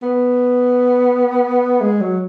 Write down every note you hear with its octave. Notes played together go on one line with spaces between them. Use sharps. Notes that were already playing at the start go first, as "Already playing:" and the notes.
B3
G#3
F#3